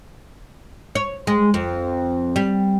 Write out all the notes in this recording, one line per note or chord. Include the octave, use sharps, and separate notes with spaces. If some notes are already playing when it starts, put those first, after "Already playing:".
C#5
G#3
F2
G3